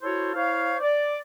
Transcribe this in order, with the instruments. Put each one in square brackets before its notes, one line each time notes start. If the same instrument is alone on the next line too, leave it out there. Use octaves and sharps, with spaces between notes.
[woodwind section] E4 F#4 A4 C5 C#5
E4 C5 C#5 F5
D5